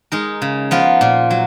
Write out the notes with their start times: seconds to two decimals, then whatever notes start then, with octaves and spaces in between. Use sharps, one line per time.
0.12 G#3 D#4 A#4
0.42 C#3
0.71 F3 B3 F4 A#4
1.01 A#2
1.31 F#3